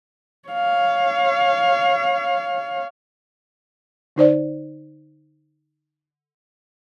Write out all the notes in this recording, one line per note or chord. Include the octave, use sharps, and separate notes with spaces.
C#5 F5
D3 D#4 C5 D5